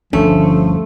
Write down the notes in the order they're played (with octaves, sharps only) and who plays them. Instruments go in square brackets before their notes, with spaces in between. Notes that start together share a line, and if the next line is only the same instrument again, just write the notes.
[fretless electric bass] G1 D2 C#4 [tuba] D3 [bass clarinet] F3 [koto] A3